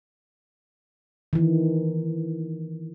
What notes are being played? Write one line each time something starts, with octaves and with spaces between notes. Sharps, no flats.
D#3 E3